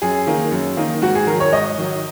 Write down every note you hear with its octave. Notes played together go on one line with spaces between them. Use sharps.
F#2 G#4
D#3 A#3 D#4
F#2
D#3 A#3 D#4
G#2 F#4
G#4
D#3 F#3 A#4
C#5
G#2 D#5
D#3 F#3